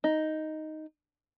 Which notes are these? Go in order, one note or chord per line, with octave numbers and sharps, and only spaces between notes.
D#4